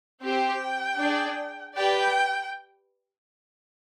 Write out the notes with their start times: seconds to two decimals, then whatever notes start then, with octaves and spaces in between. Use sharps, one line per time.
0.24 C4 G4 C5 G5
1.01 D4 G#4 D5
1.77 G4 B4 D5 G5